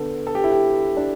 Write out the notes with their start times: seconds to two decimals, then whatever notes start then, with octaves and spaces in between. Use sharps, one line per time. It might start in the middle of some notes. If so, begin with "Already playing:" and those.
Already playing: D3 B3 A4
0.27 A4
0.35 G4
0.44 E4
0.52 G4
0.97 D4